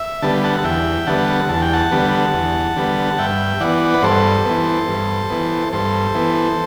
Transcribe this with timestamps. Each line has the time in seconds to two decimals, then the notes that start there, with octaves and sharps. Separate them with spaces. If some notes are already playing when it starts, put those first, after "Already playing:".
Already playing: E5
0.22 D3 G3 B3 A5
0.44 F#5 A5
0.58 A5
0.64 E2 E5 G5
1.07 D3 G3 B3 F#5 A5
1.49 E2 A5
1.62 G5
1.73 F#5 A5
1.92 D3 G3 B3
2.34 E2
2.76 D3 G3 B3
3.18 G2 E5 G5
3.60 E3 B3 D5 F#5
3.94 B4
4.03 G2 A4 C5
4.45 E3 B3
4.88 G2
5.30 E3 B3
5.73 G2 A4 C5
6.15 E3 B3